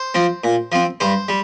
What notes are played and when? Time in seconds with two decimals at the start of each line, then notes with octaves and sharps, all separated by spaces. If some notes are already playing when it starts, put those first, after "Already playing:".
Already playing: C5
0.14 F3 C4
0.44 A#2
0.72 F3 C4
1.00 G2 C5
1.29 G3